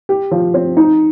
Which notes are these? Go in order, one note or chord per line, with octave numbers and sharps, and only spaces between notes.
G4
F3
C4
D#4